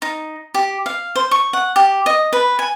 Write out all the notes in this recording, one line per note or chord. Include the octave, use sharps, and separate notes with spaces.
D#4
G4
F5
C5
C#6
F#5
G4
D#5
B4
G#5